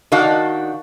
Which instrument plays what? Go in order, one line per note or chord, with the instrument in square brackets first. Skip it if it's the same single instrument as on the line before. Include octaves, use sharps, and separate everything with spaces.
[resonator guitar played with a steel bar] D#3 D4 F#4 F5 F#5